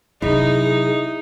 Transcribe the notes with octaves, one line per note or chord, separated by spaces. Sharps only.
C3 F#3 D#4 E4 G#4